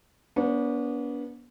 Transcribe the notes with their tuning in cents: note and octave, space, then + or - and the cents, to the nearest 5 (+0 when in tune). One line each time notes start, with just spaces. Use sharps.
B3 -35 D4 -40 C5 +0